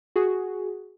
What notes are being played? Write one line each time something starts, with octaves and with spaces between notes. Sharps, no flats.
F#4 G#4